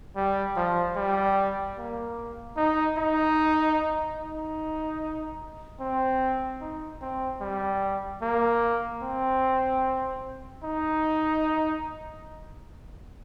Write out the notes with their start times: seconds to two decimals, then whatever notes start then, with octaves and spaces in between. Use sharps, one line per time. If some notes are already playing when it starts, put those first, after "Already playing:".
0.16 G3
0.56 F3
0.96 G3
1.78 A#3
2.57 D#4
2.98 D#4
4.19 D#4
5.80 C4
6.61 D#4
7.01 C4
7.41 G3
8.22 A#3
9.03 C4
10.64 D#4